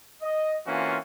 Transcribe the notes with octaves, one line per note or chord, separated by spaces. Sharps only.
D#5
E3 A#3 C4 C#4 F4 F#4